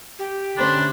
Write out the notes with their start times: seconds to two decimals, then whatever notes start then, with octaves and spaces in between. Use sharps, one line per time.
0.19 G4
0.57 D3 A3 C#4 D4 C5 B5